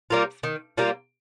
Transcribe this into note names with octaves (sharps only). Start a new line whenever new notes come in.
G3 A#3 F4
D#3
G3 A#3 F4